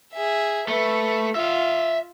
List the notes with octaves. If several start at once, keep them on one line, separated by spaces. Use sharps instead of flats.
G#4 E5
A3 B4
F4 E5 F5